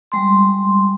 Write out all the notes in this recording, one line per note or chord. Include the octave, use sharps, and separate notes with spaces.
G3 G#3 C6